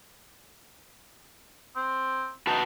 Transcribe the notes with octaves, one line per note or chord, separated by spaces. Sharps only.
C4
D#4 F#4 B4 A5